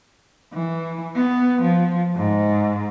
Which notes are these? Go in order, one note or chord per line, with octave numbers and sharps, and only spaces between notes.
E3
B3
F3
G#2